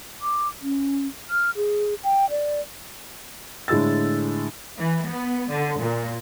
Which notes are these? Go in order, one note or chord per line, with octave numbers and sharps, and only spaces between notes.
D6
C#4
F6
G#4
G5
D5
A2 D3 G#3 E6 A6
E3
B3
D3
A#2